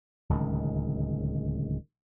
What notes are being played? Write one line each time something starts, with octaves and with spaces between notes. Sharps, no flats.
D1 C#2 D#3